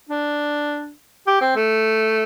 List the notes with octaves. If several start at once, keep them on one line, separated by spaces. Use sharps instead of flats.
D4
G4
C4
A3